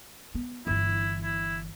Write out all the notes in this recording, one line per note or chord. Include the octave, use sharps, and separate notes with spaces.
B3
G1 E3 E4
E4